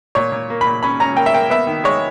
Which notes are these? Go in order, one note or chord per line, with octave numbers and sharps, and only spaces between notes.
A#2 C#5
A#2
A#3
B5
A#2
C#4 B5
C#4 A#5
A#3 G5
E5
A#3 G5
B3 E5
D#3
G#3 C#5